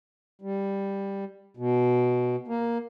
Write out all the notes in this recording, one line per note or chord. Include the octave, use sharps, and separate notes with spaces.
G3
B2
A#3